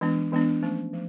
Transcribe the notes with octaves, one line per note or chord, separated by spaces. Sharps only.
E3 G#3 B3 D4
E3 G#3 B3 D4
F3 A3 C#4
F3 A3